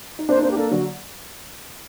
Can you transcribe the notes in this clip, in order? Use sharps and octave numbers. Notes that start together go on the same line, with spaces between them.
D#4
A#3 D4 C5
D#4
A#3 D4 C5
G4
A#3 D4 A4
D3 F#3 F#4